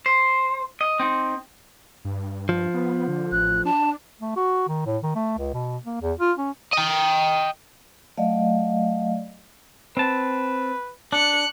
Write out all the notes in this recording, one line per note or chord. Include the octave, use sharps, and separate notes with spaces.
C5
D#5
C4 D#4
G2
F3
B3
D3
A1 F#6
D4 A5
A3
F#4
D#3
A2
D#3
A3
C#2
B2
A#3
E2
F4
C#4
D#5 G5
F#3 A3 D5 D#5 F5
C4 B4 A5
D4 F#6 C#7